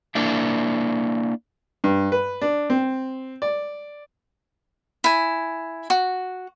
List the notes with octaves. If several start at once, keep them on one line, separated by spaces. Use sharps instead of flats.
A#3 D4 E4
G2
B4
D4
C4
D5
E4 G#5
F#4